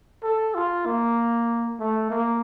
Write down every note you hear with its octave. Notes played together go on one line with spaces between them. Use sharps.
A4
F4
A#3
A3
A#3